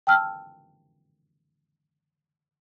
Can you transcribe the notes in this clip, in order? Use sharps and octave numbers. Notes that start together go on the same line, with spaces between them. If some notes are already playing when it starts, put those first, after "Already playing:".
G5 A5 E6 F6